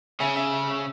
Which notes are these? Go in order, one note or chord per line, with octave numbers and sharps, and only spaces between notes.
C#3 E5 G#5
E5 G#5
E5
E5